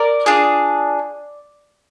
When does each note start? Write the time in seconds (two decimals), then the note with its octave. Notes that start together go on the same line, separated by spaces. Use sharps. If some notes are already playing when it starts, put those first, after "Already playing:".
Already playing: A#4 D5
0.26 D4 F4 G#4